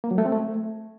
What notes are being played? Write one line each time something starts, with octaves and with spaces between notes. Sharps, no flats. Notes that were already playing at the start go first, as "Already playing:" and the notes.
A#3
F#3
A3
C4
A3